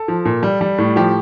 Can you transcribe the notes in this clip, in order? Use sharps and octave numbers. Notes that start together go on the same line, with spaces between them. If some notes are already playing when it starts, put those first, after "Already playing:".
Already playing: A4
F3
A#2
G3
G3
A2
F3 G4